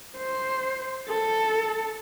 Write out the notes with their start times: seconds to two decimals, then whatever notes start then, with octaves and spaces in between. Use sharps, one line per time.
0.18 C5
1.08 A4